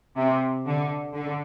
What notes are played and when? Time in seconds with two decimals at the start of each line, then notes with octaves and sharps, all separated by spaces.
0.16 C3
0.66 D3
1.14 D3